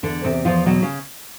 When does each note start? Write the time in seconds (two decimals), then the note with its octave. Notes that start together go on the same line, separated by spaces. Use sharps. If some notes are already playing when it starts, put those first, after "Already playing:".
0.03 E2 D3 D4
0.24 E2 C3 C4
0.45 E2 F3 F4
0.66 B2 F#3 F#4
0.82 C#3 C#4